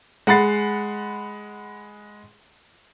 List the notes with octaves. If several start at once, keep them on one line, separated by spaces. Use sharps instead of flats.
G#3 F#5 B5 A6 C7